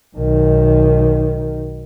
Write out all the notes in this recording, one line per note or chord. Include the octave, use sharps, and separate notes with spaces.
B1 D#3